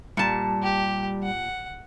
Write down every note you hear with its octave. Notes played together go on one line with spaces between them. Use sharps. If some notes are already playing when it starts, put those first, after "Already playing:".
A#2 G3 A5
G4
F#5